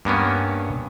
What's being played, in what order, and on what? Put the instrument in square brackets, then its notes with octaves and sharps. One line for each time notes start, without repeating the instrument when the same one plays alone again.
[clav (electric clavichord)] G2 A#3 B3 C#4